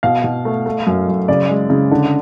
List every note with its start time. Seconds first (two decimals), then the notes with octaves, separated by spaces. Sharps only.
0.03 B2 F5
0.24 B2
0.45 A3
0.66 A3
0.87 F#2
1.08 F#2
1.28 C#3 D5
1.49 G#3
1.70 C#3
1.91 D3